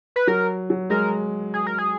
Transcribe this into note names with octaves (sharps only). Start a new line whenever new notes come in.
B4
F#3 A#4
F#3
G#3 A#4
G#4
A#4
G#4